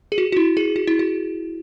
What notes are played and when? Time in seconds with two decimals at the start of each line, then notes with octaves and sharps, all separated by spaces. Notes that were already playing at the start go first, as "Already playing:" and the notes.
0.12 G#4
0.18 F#4
0.32 F#4
0.37 E4
0.57 G#4
0.76 F#4
0.87 E4
0.99 F#4